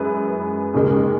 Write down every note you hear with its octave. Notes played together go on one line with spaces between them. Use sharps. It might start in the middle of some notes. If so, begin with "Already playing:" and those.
Already playing: F#2 E3 G#3 B4
D#2 C#3 G#3